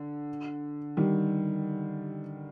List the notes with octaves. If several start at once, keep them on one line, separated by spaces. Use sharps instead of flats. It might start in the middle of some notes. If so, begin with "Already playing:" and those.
Already playing: D3
D#3 G3